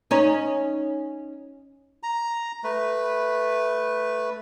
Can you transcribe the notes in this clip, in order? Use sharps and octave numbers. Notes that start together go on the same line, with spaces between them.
C#4 D#4 C#5
A#5
A3 B4